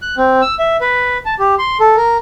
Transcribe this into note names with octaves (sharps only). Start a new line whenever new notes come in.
F#6
C4
E6
E5
B4
A5
G4
C6
A4
A#4